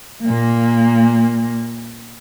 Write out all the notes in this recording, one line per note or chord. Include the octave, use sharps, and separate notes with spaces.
A#2 A#3